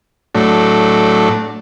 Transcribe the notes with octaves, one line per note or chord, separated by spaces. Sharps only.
A2 F#3 A3 D4